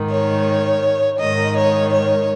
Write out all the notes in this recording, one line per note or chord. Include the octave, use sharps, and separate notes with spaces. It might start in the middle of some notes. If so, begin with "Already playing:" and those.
Already playing: G#2 D#3
C#5
G#2 D#3 D#5
C#5
C#5